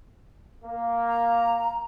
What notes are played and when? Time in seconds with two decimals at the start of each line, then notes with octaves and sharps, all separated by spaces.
0.64 A#3
1.07 A#5